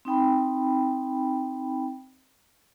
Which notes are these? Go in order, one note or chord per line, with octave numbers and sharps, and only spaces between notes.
C4 D#4 G5 B5